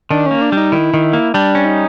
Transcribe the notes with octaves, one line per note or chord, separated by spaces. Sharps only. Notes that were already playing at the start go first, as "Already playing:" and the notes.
D#3 D4
A#3 C#4
D4
G3 D#4
D#3 E4
D#3
A#3
G3 D4
C#4
D#4